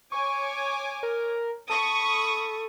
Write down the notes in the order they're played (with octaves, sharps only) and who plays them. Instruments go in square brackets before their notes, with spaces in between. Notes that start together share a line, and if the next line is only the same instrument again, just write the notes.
[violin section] C#5 G#5 D6 [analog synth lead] C#6
[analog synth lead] A#4
[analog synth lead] A4 [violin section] B5 C#6 D#6